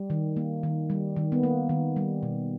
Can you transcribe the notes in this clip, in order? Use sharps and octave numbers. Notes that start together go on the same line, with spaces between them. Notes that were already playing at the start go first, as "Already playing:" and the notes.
Already playing: G3
D#3
A#3
D#3
G3
D#3
B3
A#3
D#3
G3
B2